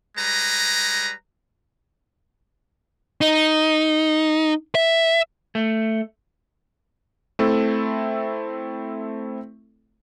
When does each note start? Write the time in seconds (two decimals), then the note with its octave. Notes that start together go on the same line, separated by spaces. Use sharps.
0.17 G3 G#3 B4 A#5
3.21 D#4
4.75 E5
5.55 A3
7.39 A3 C4 E4 A4